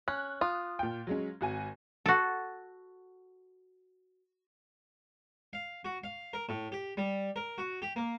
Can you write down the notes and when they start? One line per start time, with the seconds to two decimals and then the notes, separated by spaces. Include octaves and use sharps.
0.08 C#4 F#6
0.41 F4 D#6
0.79 A#2 G5
1.07 F#3 G#3 C#4
1.41 G#1 F#4 G#5
2.06 F#4 A4
5.53 F5
5.85 F#4
6.04 F5
6.33 A#4
6.49 A2
6.72 G4
6.97 G3
7.36 A#4
7.58 F#4
7.82 G4
7.96 A#3